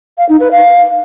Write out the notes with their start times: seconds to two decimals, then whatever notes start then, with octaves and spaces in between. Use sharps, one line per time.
0.17 F5
0.29 D#4
0.40 B4
0.51 F5